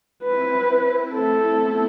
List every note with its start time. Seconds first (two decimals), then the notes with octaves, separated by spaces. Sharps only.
0.24 C4 E4 B4
1.14 A3 C4 A4
1.58 B3